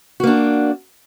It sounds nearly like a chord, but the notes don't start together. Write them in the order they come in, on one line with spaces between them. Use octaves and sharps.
F#4 A#3 D4